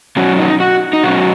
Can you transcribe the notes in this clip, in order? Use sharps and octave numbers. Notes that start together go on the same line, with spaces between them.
B2 F#3 C#4 F#4
D#4
F#4
D#4
B2 F#3 C#4 F#4